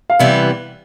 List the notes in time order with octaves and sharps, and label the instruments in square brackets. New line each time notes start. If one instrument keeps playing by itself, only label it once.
[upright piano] F5
[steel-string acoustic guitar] C3 E3 G3 B3 [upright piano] E5